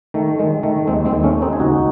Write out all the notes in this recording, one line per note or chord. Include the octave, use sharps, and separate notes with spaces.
D#3 A3
D#3 G#3
D#3 A3
D#2 G#3 C4
G#3 C4
D#2
A3 C#4
D#3
C4 D#4
G#4
C#2 D#4 F#4